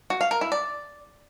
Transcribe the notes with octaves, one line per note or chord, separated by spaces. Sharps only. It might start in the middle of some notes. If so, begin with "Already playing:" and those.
F#4
F5
A#4
E4
D5